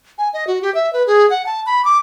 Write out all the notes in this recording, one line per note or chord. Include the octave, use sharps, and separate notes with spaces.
G#5
D#5
F#4
G4
E5
B4
G#4
F#5
A5
B5
D6